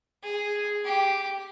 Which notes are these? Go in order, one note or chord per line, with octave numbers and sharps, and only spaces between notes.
G#4
G4